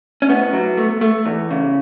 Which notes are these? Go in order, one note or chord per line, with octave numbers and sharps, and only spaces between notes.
C#4
A2 B3
F#3
A3
A3
E2
C#3